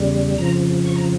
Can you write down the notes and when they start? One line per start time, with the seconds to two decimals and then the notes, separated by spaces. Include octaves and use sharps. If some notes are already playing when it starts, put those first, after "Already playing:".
Already playing: E2 C#3 G3
0.38 F2 C#3 F3 A#5
0.86 C#6
0.96 A#5